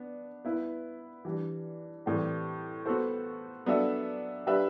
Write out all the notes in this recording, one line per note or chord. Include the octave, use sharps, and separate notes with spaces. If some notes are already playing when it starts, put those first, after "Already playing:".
Already playing: B3 D4
B3 E4 B4
E3 G3 D4
A2 E3 G3 C4 G4
B3 F#4 A4 C5
F#3 B3 D4 A4 E5
G3 D4 G4 B4 E5